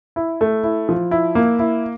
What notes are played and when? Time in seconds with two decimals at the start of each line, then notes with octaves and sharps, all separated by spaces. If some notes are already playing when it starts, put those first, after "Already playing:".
0.16 E4
0.41 A3
0.64 E4
0.89 F3
1.11 E4
1.35 A#3
1.59 E4